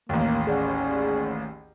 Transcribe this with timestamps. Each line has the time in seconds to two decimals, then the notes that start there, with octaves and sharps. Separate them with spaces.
0.09 A1 D#2 A#3
0.47 C#4 G#4 D5 F#5